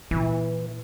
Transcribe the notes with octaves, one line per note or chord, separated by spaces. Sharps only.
A#2 E3 E4